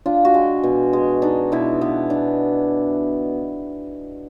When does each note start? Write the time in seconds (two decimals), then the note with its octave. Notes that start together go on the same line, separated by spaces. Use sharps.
0.06 D4 F4
0.25 F#4
0.34 G#3
0.64 B2
0.93 G#3
1.22 D4 D#4
1.52 B2 E4
1.81 B3
2.10 D4